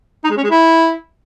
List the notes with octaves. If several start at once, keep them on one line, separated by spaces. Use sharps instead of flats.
D#4
G#3
C#4
G#3
E4